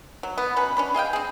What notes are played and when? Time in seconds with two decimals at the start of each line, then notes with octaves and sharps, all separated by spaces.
0.23 F#3
0.38 B3
0.56 B2 F#3 C#4 B4
0.77 C#4 D4 B5
0.94 G#4 D#5 F5 G5
1.13 C4 G#4